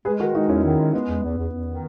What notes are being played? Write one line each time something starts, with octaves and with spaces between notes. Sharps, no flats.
G#3 G#4 B4
D#3 F#4 A#4
G#3 D#4 F#4
E2 C#4 E4
D#3
G#3
G#3 B3
E2
E2
E2
E2
D#3